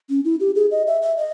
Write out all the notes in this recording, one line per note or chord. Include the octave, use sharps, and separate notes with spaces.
C#4
E4
G4
G#4
D#5
E5
E5
D#5